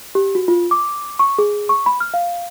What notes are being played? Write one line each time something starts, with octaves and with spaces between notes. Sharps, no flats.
G4
F#4
F4
D6
C#6
G#4
C#6
B5
F6
F5